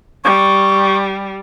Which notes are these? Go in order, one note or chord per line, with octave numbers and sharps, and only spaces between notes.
G3 C#6